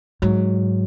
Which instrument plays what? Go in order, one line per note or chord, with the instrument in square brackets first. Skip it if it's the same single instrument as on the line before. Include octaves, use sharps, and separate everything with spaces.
[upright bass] G#2 [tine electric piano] F#3